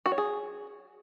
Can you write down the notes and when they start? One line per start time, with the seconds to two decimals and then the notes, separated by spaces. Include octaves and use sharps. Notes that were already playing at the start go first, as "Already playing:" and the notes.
0.06 F#4
0.12 C#5
0.18 G#4